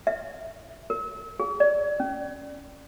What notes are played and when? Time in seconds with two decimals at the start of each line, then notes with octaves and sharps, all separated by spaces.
0.07 E5
0.90 A#4
1.40 G#4
1.60 D5
2.00 C#4